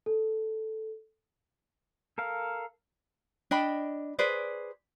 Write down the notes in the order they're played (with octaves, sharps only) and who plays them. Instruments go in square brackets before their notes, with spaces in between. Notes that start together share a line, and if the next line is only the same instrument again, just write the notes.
[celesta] A4
[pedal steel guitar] A4 A#4 F5
[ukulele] D4 D#5 G5 B5
G#4 B4 C5 D5